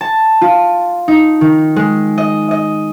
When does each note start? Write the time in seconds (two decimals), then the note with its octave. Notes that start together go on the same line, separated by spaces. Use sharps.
0.01 A5
0.42 F4
1.08 D#4
1.41 D#3
1.76 G#3
2.18 D#5
2.51 D#5